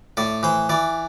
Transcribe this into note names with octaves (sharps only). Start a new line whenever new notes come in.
A2 D5
E3 C5
E3 D5